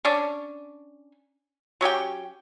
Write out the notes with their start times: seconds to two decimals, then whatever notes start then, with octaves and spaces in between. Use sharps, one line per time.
0.05 C#4 D4
1.81 F#3 C#4 G4 G5